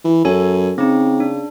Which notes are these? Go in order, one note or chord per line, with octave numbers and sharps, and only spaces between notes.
E3
F#2 A4 C#5 G#5
C#3 C4 D#4
D4